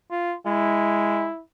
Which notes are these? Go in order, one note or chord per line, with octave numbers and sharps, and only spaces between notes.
F4
G#3 E4